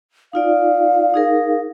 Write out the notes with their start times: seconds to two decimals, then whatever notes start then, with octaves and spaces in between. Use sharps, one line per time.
0.33 D#4 F4 D5 F5
1.14 D#4 G#4 A#4